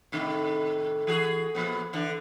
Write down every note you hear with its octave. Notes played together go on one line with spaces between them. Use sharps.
A2 C3 D#3
E3 F#4 G#4
A#2 F3 B3
D3 E3